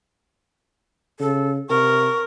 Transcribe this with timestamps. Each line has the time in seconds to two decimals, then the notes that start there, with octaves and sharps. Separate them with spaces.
1.20 C#3 A4
1.70 C3 A#4 C#6